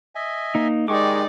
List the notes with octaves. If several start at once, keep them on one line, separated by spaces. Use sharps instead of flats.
D#5 E5 G#5
A#3 D#4
D#3 G#3 D#4 G4 D5 C#6 D6